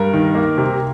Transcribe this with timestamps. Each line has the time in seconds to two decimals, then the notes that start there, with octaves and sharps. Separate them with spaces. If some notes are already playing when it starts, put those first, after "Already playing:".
Already playing: G2 A#4
0.13 D#3
0.35 A#3
0.58 C3